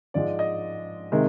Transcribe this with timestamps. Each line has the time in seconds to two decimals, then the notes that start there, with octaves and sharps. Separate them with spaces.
0.14 G#2 F3 G#3 D5
0.39 D#5
1.12 C3 D#3 G#3